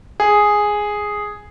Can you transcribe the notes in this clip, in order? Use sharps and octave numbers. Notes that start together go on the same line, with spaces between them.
G#4